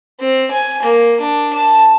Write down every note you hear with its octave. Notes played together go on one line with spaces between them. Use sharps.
C4
G#5
A#3
D4
A5